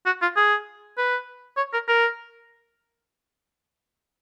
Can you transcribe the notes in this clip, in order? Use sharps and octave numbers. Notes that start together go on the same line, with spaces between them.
F#4
F4
G#4
B4
C#5
A#4
A#4